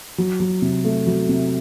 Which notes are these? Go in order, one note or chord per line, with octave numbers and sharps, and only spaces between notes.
F#3
F#3
C3
A3
F#3
C3